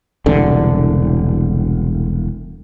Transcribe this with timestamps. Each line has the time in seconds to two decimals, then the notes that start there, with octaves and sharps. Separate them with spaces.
0.26 E1 C2 D3